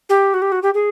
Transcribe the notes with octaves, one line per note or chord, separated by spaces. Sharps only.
G4
F#4
G4
F#4
G4
G#4